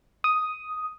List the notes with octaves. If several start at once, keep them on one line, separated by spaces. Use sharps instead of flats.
D#6